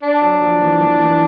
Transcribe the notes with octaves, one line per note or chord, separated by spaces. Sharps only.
D4
F#3
F3
E3
E3
E3